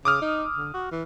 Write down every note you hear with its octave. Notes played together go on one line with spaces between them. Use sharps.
C#3 D6 D#6 F6
D#4
D3
F#4
E3